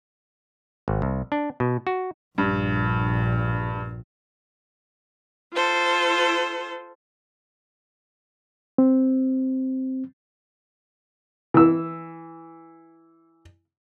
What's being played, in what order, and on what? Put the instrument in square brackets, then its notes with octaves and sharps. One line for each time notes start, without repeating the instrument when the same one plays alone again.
[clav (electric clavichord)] G#1
C2
D4
B2
F#4
[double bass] A#1 [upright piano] G2
[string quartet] F4 A4 C5
[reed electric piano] C4
[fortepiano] E3 E6